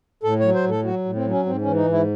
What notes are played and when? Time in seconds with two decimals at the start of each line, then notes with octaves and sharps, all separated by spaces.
0.23 A2 A4
0.39 F#3 C#5
0.54 C5
0.64 A2
0.70 A4
0.84 F#3 F#4
1.05 A2
1.15 C4
1.25 F#3
1.31 C#4
1.46 G#2 C4
1.61 E3 C#4
1.76 D#4
1.86 G#2 E4